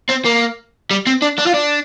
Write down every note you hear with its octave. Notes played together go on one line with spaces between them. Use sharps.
C4
A#3
G3
C4
D4
D4
F4
D4